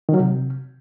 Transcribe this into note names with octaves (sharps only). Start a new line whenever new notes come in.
D#3
F#3
C3